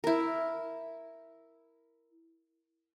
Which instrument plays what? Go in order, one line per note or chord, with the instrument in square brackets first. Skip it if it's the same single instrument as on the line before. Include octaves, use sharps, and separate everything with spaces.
[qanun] E4 A#4